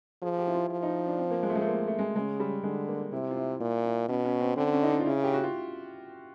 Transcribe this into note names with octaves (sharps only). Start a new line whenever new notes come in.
F3 G#4
G4
E4
F4
F3
D#4
D4
C4
A#3
G#3
A3
G#3
A3
A#3
A3
G#3
C#3 G#3
G3
D3 G#3
A#3
C3 E4
F4
E4
A#2 E4
E4
B2 C#4
C#4
C4
D3 C4
C#4
D#4
D4
F4
C#3 E4
G4
F#4
F4